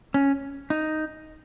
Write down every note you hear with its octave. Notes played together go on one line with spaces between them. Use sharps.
C#4
D#4